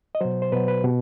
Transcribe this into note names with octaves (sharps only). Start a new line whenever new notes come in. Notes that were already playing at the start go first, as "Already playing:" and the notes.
D#5
B2 F#3 C5
C5
B2 F#3 B4
B4
B2 G4